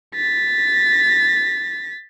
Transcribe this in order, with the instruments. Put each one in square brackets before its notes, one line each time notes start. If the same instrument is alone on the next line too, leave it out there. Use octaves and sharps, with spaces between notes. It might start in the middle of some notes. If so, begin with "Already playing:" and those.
[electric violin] A6 B6